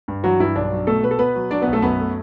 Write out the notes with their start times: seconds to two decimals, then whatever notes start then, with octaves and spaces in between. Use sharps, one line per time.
0.08 G2
0.23 E3 F#3 F#4
0.40 G2 E4
0.55 B1 D4
0.71 F#3
0.87 B2 A3 A4
1.03 B2 B4
1.11 A4
1.19 B2 B3 B4
1.35 F#3
1.51 F#3 D4 D5
1.62 B3 B4
1.67 B1
1.73 A3 A4
1.82 F#2 B3 B4
1.99 A3